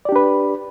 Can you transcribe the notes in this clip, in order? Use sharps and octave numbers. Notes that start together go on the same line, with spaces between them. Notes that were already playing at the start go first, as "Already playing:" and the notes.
D4 G4 B4 D5